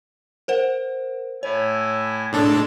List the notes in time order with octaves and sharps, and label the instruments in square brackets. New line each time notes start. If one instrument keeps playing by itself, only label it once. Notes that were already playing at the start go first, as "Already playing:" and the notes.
[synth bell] A#4 C5 F#5
[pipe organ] A2 E4 G#5 [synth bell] C#5
[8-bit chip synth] A2 D4 A4 [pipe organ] G#3